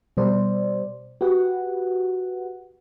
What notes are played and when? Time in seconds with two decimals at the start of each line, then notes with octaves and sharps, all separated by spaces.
0.17 B2 G3 C5 D5
1.21 F#4 G4 B4 F#5